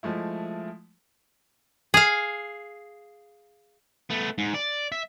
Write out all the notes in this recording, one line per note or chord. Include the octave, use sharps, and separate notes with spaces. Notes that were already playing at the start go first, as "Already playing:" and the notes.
F3 G#3 A3 E4
G#4 F5
A3 B3
G#2
D5
E5